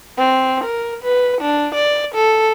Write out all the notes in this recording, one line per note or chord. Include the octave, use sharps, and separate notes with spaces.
C4
A#4
B4
D4
D5
A4